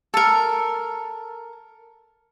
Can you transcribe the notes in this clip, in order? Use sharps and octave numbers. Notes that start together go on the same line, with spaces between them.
A4 A#4